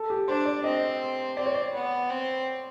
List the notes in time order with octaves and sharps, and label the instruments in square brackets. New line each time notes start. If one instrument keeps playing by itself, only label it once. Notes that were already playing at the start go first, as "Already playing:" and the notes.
Already playing: [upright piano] A4
G4
[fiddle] D4 [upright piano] C5
[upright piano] D5
[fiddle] C4 [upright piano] D#5
[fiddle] C4 [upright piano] D5
[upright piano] C#5
D5
[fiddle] B3
C4